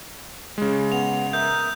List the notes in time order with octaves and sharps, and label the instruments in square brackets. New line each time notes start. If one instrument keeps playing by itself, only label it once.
[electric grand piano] C#3 G#3
[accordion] B3 [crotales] F7
[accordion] A#4 E5 D#6 [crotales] G6